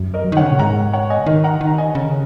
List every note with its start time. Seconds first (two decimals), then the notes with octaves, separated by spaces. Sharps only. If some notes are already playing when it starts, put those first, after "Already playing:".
Already playing: F#2
0.14 A#4 D#5
0.25 F#3
0.32 D#3
0.37 C#3 C#5 F#5
0.51 A#2
0.59 G#2 F#5 A#5
0.93 C#5 F#5
1.10 D#5 G#5
1.19 C#3
1.26 D#3 A#4 D#5
1.44 F#5 A#5
1.61 D#3
1.67 A#5
1.78 D#5 G#5
1.95 C#3